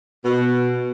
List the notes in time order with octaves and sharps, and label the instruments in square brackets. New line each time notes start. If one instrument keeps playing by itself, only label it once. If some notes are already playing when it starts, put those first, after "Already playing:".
[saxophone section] B2